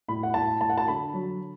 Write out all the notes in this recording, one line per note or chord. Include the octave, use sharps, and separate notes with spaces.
A2 B5
F#5
A2 A5
A2 A5
F#5
A5
D3 B5
F#3